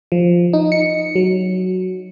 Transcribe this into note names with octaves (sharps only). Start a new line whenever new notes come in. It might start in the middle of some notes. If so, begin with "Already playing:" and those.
F3
D#4
C#7
F#3